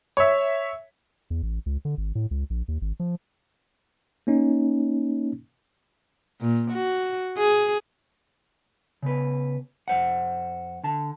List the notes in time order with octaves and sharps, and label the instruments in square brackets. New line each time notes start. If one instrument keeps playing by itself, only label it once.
[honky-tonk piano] C#5 E5
[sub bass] E2
A1
C#2
D3
G#1
A2
C#2
A#1
D#2
G#1
F3
[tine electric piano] A#3 C#4 D#4
[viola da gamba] A#2
F#4
G#4
[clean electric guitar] C#3 B3 B4
F2 C5 F#5
D3 A5